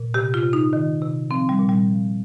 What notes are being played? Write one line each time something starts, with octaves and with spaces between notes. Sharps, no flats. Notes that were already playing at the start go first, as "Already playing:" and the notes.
Already playing: A#2
C3 G4
F4
C3
D#4
D#3
C3
F3 C4
G3
A#2
G3
F3